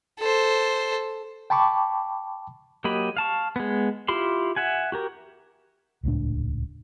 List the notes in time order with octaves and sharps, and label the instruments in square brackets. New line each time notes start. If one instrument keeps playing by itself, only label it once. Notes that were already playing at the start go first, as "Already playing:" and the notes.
[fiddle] A4 C5
[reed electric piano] G5 A5 B5 C#6 D6
[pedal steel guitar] F#3 A#3 G4 D#5 B5
F5 A5 C#6
G#3 B3
E4 F4 G4 B5 C6
E5 F#5 G#5
F#4 G4 A#4
[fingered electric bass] D#1 C#2 A2 D4